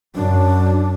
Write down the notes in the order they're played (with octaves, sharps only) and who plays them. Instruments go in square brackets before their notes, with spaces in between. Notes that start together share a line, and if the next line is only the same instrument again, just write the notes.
[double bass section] F#2 [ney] D4